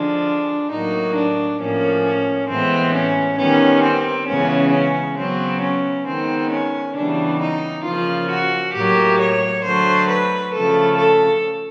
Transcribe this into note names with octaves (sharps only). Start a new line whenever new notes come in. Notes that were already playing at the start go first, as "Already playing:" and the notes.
Already playing: D3 F3 G#3 D4
A2 F#3 A#3 D#4
D4
A2 F3 A#3 C#4
C#4
A2 E3 G#3 B3 C4
C#4
D#3 G3 B3 C#4
C4
C#3 E3 G#3 B3 C#4
C#4
C#3 F#3 B3 C4
C#4
D#3 G#3 B3 C4
C#4
C#3 E3 G3 B3 D4
D#4
C#3 F3 A#3 F4
F#4
A2 F#3 A#3 G4
C#5
D3 F#3 A3 C5
B4
C#3 F3 A3 A4
A4